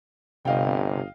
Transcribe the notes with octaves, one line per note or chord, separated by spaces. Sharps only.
G1 C3 D#5 F5 G5